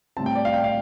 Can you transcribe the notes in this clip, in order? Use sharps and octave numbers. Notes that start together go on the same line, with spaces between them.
A2 G3 C4 A5
G5
D5
F5
G5
F5